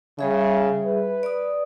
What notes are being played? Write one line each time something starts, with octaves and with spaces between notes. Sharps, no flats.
C#3 G3 G#4 E5
B4
D5 D#6